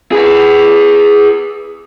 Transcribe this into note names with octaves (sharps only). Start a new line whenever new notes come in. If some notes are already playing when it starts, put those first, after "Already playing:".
G#4 B4